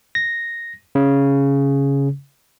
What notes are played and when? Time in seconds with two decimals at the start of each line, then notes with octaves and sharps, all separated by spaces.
0.15 A#6
0.95 C#3